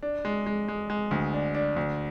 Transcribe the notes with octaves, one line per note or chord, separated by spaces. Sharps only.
D4
G#3
G#3
G#3
G#3
D2
D4
D4
D2